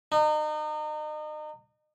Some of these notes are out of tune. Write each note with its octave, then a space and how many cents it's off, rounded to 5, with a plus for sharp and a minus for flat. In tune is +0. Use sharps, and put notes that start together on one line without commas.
D#4 -35